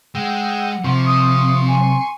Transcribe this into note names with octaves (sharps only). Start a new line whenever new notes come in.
G#3 F#5 G5 E6
C3 F3 C6 C#6
D#6
G#5